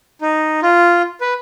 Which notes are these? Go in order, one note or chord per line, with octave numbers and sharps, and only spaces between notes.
D#4
F4
B4